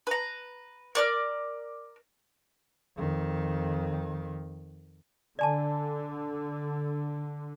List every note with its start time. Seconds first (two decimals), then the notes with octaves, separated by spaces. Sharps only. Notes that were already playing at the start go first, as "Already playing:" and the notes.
0.07 B4 A#5
0.95 A#4 D5 F6
2.97 F2 D#3
5.39 D3 D5 G#5 A5